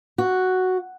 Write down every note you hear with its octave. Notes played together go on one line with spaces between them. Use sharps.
F#4